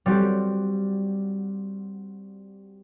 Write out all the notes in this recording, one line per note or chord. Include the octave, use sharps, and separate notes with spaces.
G3 C4 F#4 G4